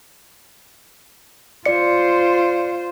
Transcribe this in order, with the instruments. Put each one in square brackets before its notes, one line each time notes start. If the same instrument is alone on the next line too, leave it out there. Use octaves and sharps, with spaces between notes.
[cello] F4 C5 [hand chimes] D5 C#7